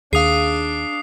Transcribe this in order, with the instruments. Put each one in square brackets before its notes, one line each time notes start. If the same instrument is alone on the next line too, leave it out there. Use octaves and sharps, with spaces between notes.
[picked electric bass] D#2 [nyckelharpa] D4 [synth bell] G#4 F5 [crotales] D#6 C7